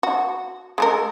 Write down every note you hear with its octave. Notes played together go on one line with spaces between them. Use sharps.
F#4
G#3 A3 A#4